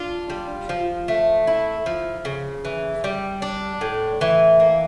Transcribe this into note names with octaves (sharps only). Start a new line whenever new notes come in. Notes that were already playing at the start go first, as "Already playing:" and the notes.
Already playing: D4 F4
G3
F3
A3
E4
F3
C#3
E3
G3
D4
A2
E3
A#3